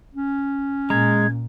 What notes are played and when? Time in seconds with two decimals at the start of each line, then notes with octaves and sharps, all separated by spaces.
0.14 C#4
0.90 A#2 G#3 A#5 G#6